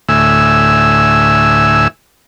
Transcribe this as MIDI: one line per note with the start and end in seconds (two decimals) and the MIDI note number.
0.09 1.88 38
0.09 1.88 45
0.09 1.88 76
0.09 1.88 80
0.09 1.88 88